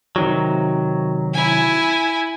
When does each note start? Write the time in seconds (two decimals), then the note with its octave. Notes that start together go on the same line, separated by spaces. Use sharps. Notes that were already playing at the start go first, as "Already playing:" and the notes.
0.16 C3 D#3 F#3
1.34 E4 G#5